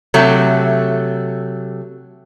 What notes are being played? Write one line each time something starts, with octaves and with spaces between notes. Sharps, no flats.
C3 F#3 A3